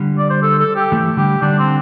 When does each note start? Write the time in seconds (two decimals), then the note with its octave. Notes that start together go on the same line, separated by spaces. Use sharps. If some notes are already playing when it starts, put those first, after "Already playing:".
Already playing: D3 G3
0.18 D5
0.30 C5
0.42 A4
0.59 A4
0.76 G4
0.92 E3 A3
1.17 D3 G3 G4
1.42 D3 G3 D4
1.59 C4